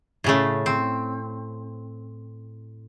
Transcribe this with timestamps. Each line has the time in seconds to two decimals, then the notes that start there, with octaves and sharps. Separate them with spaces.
0.24 A2 C#3 A3
0.66 C4